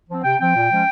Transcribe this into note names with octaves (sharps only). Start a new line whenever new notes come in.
F3 C4
C3 G5
F3 C4 G5
A#2
F3 G#3 C#4